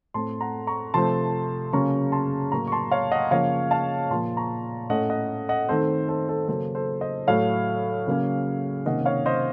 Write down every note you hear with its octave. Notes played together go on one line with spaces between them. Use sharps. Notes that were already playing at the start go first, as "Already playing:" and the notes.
A2 A3 C4 A5 C6
F#5 A#5
A#5 C#6
C3 F3 A3 C4 A5 C6
C#3 F#3 A#3 C#4 A#5 C#6
A5 C6
A2 F#3 A#3 A#5 C#6
C#6
A5 C6
C#5 F5
D#5 F#5
C#3 F3 A#3 C#5 F5
F5 A5
A#2 F3 A#3 A5 C6
A#5 C#6
A2 A3 C#4 D#5 F#5
D#5 F#5
D#5 F#5
D#3 A3 C4 A4 C5
A4 C5
A4 C5
C#3 F#3 A#3 C#4 A4 C5
A4 C5
C5 D#5
A2 F#3 A3 C#5 F5
C#3 F#3 A#3 C#4
C3 D#3 A#3 C#4 D#5 F#5
C#5 F5
C5 D#5